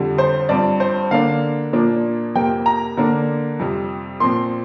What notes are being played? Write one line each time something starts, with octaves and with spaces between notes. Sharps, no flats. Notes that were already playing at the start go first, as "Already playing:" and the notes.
Already playing: F2 D3 G3
C5
G2 F3 C4 D5
C5
D3 A#3 D4 F5
A#2 F3 A#3 D4
F2 C3 A#3 G5
A#5
D3 A#3 D4
F2 C3 G3
A#2 F3 C4 C6